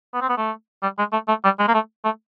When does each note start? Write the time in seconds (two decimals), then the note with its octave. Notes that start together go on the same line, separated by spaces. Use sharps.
0.14 B3
0.22 C4
0.29 B3
0.37 A3
0.83 G3
0.99 G#3
1.13 A3
1.29 A3
1.44 G3
1.59 G#3
1.68 A#3
1.74 A3
2.05 A3